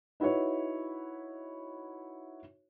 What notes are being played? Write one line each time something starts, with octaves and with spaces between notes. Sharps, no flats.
D#4 E4 F#4 B4 C#5